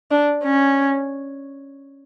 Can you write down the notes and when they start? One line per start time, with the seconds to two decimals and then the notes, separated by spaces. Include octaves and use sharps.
0.11 D4
0.44 C#4